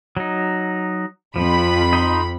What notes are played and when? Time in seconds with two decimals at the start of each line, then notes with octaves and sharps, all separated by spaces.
0.17 F#3 D#4
1.36 F2 F3 B5
1.93 D#4 C6